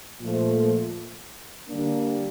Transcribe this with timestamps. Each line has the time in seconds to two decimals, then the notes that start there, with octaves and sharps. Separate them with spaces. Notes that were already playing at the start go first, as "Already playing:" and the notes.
0.21 A#2 F3 A3
1.68 D3 G3 A#3 D4